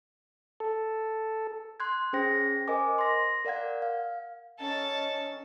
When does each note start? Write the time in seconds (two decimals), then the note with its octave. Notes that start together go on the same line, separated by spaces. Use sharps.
0.60 A4
1.80 C6 F#6 G#6
2.13 C#4 G#4 C5 G5 A#6
2.68 A#4 C5 D#5 G#5 D6
2.98 C6 A#6
3.45 A#4 D5 F5 F#5 G#6
3.82 F5
4.60 D#3 C#4 A4 A5